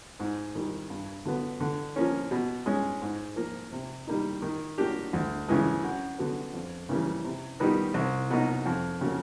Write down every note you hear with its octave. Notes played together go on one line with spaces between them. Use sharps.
G#2
D#3 G3
G2
D3 F#3 B3
D3
F3 A#3 C#4
B2
G#3 C#4
G#2
F3 A#3
C3
D#3 G3 A#3 D#4
D#3
F#3 A#3 D4 G4
D2
C#3 E3 G#3
F#2
D3 F#3 B3
F2
C#3 E3 G3 A#3
C3
D#3 G3 B3 D#4
C2
B2 F#3 A#3 D#4
F2
C#3 F#3 A#3